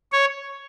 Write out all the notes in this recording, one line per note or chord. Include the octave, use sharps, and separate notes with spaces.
C#5